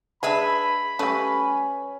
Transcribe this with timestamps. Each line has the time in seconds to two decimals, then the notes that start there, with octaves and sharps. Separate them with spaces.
0.23 G#3 D4 G#4 B4 E5 B5
0.99 G3 A3 C#4 B4